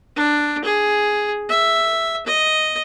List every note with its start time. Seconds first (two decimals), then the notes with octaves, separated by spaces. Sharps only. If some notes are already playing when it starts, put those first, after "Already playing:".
0.16 D4
0.64 G#4
1.49 E5
2.27 D#5